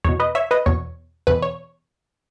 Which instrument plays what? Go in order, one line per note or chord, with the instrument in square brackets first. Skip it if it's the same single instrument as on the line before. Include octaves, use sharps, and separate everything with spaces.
[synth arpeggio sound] E2 B2 C#5
B4 D#5
C#5 E5
B4 D#5
E2 B2 C#5
E2 B2 B4
C#5